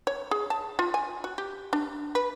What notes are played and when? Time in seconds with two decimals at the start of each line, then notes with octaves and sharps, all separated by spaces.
0.07 C#5
0.31 G#4
0.50 A5
0.79 F4
0.94 G#5
1.24 F#4
1.38 G4
1.73 D4
2.15 B4